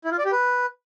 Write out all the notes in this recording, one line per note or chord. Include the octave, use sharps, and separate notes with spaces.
E4
F4
D5
G4
B4